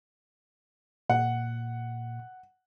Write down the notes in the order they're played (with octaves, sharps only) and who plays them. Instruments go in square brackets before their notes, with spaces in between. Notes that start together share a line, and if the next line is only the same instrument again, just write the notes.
[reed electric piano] A#2 [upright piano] F#5